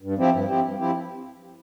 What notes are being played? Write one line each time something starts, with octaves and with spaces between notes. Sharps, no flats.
G2
F3 C4 E4 G4
G2
F3 C4 E4 G4
G2
F3 C4 E4 G4